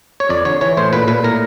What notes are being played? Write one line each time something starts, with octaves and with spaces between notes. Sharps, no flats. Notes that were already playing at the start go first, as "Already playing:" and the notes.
C#5
F2 D5
D3 C#5
E3 C#5
A2 C5
A#2 B4
A#2 B4
A2 A#4